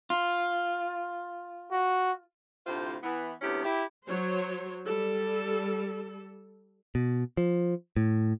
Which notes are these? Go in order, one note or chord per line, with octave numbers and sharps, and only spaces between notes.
F4
F#4
D2 A2 C3 F4 C5
E3 B3 E4
D2 C3 B3 C#4 E4 G4
E4 G4
F#3 C5 C#5
G3 A4
B2
F3
A2